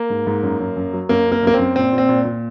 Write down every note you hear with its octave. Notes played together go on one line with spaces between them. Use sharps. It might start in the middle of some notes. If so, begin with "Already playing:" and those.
Already playing: A#3
G#2
G#2
F#2
F#2
F#2
F#3
F#2 A#3
F#2
A#3
F#2 A#3
C4
F#2
A#2 C4
A#2
C4
A#2
A#2